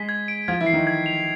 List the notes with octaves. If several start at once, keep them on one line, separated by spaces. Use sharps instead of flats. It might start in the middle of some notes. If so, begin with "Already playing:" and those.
Already playing: G#3 G#4 B6
G#6
D7
F3 F4 G#6
E3 E4
C7
D#3 D#4
G#6
F7